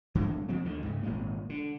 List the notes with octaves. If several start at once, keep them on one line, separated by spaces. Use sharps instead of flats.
G2 D3 G#3 A3
F3 F#3 C4
D2 D3 D#3
G#2 C#3
G#1 A#2 G#3
D3